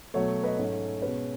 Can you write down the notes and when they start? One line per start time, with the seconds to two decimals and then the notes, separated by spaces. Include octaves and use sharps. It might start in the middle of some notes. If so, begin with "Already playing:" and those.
0.14 B2 F#3 A3 C#5
0.44 B4 D#5
0.58 G#2 F#3 A3 C#4 C#5
1.02 B2 G#3 C#4 B4